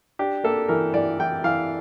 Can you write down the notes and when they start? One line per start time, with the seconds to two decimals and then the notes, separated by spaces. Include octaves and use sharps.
0.19 D4 G4
0.44 A#3 A4
0.68 E3 A#4
0.94 E3 D5
1.19 E3 G5
1.44 E3 F5